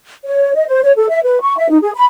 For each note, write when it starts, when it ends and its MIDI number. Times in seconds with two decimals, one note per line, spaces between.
0.24 0.53 73
0.55 0.66 75
0.68 0.81 72
0.83 0.91 73
0.97 1.07 69
1.09 1.20 76
1.24 1.39 71
1.41 1.55 85
1.58 1.69 76
1.70 1.77 63
1.82 1.91 68
1.95 2.04 83